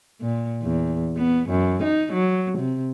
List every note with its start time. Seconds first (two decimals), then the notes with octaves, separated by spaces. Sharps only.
0.21 A#2
0.63 E2
1.17 B3
1.50 F#2
1.84 D#4
2.13 F#3
2.58 C3